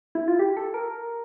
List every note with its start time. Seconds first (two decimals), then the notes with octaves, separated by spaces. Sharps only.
0.15 E4
0.28 F4
0.39 G4
0.57 A4
0.74 A#4